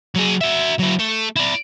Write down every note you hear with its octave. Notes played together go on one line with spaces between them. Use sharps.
F#3 G#4
F#4 E5
F#3 E4
A3
E4 D5